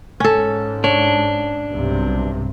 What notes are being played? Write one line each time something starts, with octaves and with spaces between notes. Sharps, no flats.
G#2 C#4 A4
D4 C#5
B1 G2 C3